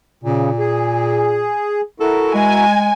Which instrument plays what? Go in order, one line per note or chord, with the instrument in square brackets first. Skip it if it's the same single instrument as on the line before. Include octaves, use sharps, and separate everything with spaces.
[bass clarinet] A#2 [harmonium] C#3
[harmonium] G#4
[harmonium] E4 F#4 A#4 [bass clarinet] A4
[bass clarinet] G#3 [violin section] G#5